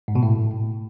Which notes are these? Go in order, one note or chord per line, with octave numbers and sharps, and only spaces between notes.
G#2
B2
A2